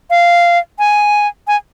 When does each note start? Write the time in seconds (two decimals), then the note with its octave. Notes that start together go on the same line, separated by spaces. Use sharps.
0.10 F5
0.79 G#5
1.47 G#5